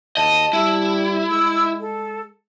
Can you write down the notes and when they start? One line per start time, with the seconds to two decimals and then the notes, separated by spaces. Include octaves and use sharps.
0.17 D#2 D#5 A5
0.53 G3 E4
1.30 G#3 E6
1.80 A4